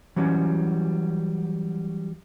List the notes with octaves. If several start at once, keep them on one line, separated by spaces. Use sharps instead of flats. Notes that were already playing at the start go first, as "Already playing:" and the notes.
E3 F#3 G3 C#4